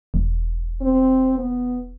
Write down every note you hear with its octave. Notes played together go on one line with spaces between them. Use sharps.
E1
C4
B3